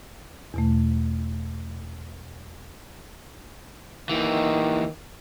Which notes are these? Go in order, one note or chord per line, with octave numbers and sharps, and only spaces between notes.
E2 B2 A3
D#2 D#3 E3